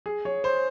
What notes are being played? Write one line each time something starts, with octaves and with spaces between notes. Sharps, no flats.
G#4
C#5
C5